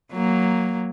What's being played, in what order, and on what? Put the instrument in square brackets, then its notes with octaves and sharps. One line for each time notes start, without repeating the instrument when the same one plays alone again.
[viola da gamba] F#3 A#3